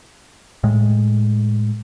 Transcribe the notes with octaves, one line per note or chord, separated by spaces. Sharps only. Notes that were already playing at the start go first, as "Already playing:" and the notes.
A2 G#3